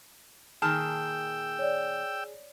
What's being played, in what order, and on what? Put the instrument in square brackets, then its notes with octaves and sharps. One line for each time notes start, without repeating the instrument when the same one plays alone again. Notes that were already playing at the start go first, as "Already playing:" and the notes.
[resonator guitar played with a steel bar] A#2 D#3 A5 [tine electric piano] G#4 [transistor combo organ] G5 E6 [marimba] F6
[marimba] C#5 D5